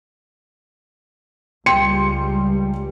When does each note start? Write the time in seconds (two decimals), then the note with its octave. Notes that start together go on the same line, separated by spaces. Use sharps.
1.66 C#2 G3 G5 C6 C#7